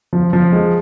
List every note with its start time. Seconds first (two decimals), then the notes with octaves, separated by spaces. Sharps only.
0.13 F3
0.33 F3
0.52 G#3